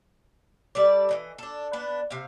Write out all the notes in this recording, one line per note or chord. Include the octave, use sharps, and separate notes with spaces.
G3 A4 D5
E3 F#3 D#5
D4 A4
B3 D4
C3 F5